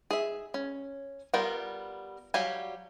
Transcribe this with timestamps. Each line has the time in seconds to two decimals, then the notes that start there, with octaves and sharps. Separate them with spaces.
0.11 G#4 E5
0.54 C#4
1.34 G3 B3 F4 A#4 G5
2.34 F#3 G3 G4 F5 G#5